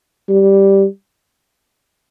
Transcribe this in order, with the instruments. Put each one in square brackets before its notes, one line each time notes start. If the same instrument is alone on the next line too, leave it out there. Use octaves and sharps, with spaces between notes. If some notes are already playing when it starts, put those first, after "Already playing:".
[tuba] G3